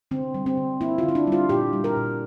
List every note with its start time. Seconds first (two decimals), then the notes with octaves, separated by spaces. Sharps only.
0.11 D3 C4
0.34 G3
0.46 C4
0.57 D3
0.81 A#3 E4
0.98 D3 F4
1.09 E4
1.15 D4
1.27 G3 F4
1.49 A#2 G4
1.73 G3
1.84 A#4
1.96 A#2